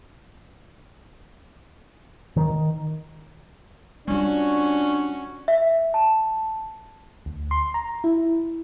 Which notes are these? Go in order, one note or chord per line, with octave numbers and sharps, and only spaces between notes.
D#3
G3 C#4 D4 F4 F#4
E5
A5
D2
C6
A#5
E4